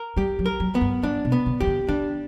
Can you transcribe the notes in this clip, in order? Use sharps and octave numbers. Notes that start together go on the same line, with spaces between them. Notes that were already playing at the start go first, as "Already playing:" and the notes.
Already playing: A#4
G3 G4
F#3
A#4
F#3
B3
G2
G2 D4
B2
B3
C#3
E3 G4
D3
D3 D4